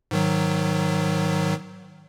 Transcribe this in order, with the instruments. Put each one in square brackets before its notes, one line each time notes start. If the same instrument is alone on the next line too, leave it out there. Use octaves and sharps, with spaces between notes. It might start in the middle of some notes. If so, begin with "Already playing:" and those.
[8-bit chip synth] G#2 D#3 F#3